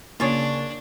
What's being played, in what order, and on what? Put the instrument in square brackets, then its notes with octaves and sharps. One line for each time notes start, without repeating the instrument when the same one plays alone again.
[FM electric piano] C#3 A#3 [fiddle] D4 [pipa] F4 G#4 C#5